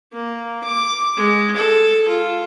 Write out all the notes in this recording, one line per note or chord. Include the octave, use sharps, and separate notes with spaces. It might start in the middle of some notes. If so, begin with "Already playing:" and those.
A#3
D6
G#3
A4
F4